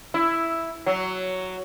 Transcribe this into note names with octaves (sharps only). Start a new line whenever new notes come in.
E4
F#3